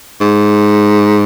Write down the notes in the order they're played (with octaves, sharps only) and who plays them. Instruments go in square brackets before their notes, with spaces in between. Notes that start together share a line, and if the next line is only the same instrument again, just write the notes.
[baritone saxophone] G#2